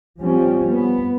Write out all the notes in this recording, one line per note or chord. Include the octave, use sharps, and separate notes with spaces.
F3 G3 C4 C#4
B3